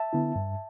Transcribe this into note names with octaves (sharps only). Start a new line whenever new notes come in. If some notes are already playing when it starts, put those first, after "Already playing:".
Already playing: E5 A5
D3 B3 E4
G2